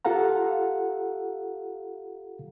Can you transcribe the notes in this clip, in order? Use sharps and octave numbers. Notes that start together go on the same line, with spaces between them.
F4 G4 A4 F5 F#5 A#5